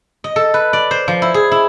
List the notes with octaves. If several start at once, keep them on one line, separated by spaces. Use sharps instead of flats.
D#5
A4
B4
D5
C5
F3
E4
G#4
E4